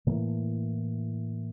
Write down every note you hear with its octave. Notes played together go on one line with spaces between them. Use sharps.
A2 E3 A#3